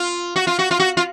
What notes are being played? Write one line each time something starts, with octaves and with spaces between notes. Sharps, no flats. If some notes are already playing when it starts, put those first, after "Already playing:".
Already playing: F4
F#4
F4
F#4
F4
F#4
F4